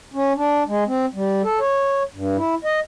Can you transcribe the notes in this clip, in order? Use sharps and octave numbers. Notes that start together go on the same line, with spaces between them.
C#4
D4
G#3
C4
G3
A4
C#5
G2
E4
D#5